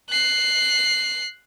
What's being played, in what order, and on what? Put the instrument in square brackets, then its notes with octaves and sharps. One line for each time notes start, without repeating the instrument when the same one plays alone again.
[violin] F#6 C7